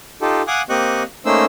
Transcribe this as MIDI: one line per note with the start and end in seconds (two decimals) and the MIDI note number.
0.22 0.42 63
0.22 0.42 65
0.22 0.42 67
0.22 0.42 69
0.47 0.62 77
0.47 0.62 78
0.47 0.62 80
0.47 0.62 86
0.47 0.62 87
0.47 0.62 90
0.69 1.03 58
0.69 1.03 60
0.69 1.03 67
0.69 1.03 75
0.69 1.03 85
0.69 1.03 90
1.25 1.45 57
1.25 1.45 58
1.25 1.45 61
1.25 1.45 63
1.25 1.45 72
1.25 1.45 88